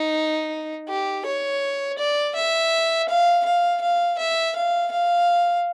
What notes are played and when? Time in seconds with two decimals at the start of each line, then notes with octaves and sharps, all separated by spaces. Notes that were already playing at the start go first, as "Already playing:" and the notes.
Already playing: D#4
0.89 G4
1.25 C#5
1.98 D5
2.35 E5
3.09 F5
3.45 F5
3.82 F5
4.19 E5
4.56 F5
4.92 F5